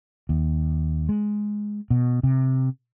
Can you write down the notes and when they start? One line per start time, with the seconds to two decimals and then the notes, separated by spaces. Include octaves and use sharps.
0.29 D#2
1.09 G#3
1.90 B2
2.23 C3